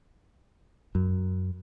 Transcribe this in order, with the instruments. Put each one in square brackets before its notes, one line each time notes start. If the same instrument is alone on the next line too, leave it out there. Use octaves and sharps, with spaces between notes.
[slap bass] F#2